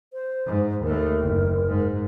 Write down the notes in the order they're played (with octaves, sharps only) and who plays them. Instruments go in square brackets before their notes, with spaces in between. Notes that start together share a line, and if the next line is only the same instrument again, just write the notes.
[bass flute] C5
[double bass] G#2
[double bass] D#2 A3 [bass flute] A#4
[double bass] F#1
G#2